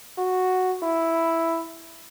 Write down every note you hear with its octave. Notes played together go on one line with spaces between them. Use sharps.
F#4
E4